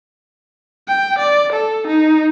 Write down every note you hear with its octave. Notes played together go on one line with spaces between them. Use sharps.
G5
D5
A4
D#4